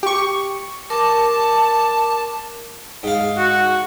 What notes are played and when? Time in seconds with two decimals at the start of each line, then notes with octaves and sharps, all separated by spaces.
0.03 G4 C#6
0.90 A#4 A5 D6
3.03 G#2 F5
3.37 F#4